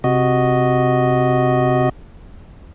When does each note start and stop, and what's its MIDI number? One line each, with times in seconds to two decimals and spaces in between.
0.04 1.89 48
0.04 1.89 66
0.04 1.89 75